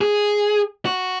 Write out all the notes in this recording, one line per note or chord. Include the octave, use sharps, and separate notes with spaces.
G#4
F#4